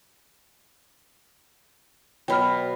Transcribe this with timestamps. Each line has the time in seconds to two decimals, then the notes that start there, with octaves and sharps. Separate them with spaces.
2.28 B2 F#3 G5 B5 F6